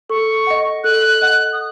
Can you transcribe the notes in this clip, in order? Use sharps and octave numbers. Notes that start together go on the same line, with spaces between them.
A4 C#6
D#5 F#5
A4 F#6
D#5 F#5
D#6